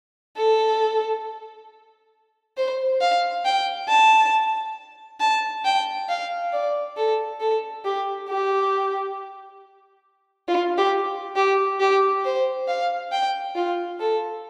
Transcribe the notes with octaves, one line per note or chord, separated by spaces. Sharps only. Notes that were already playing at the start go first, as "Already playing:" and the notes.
A4
C5
F5
G5
A5
A5
G5
F5
D5
A4
A4
G4
G4
F4
G4
G4
G4
C5
F5
G5
F4
A4